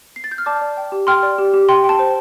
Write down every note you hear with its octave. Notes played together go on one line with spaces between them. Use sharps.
C7
A6
G6
F6
D5 A5 D6
D5
G5
G4
G5 C6 F6
D5
G4
G4
G5 C6
G5
A5
C5